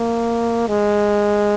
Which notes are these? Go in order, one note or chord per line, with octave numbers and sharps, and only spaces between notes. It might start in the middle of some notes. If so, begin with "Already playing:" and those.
Already playing: A#3
G#3